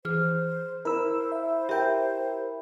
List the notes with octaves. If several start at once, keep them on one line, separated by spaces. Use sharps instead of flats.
E3 G#4 C5 F6
E4 A#4 C5 E6
E5
G4 A#4 E5 G5 G6